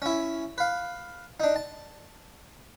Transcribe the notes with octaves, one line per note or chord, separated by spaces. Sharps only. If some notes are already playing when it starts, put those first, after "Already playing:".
C#4 E4
B4 F5
D4 D#4
A5